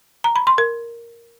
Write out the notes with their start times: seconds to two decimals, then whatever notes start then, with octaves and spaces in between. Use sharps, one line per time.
0.24 A#5
0.36 B5
0.47 C6
0.58 A#4